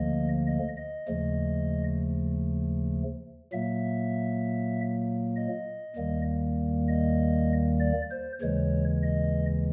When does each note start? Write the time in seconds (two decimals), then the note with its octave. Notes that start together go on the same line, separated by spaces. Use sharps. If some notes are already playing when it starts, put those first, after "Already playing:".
Already playing: D2 D3 F3 A#3 D#5
0.47 D#5
0.77 D#5
1.07 D#2 C#3 F3 A3
3.52 A#2 F#3 A#3 E5
5.36 D#5
5.96 D#2 D#3 G3 A#3
6.88 D#5
7.80 D5
8.11 C5
8.42 D#2 C#3 E3 G#3 C#5
9.03 D#5